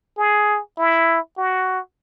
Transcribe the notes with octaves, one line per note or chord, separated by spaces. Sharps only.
G#4
E4
F#4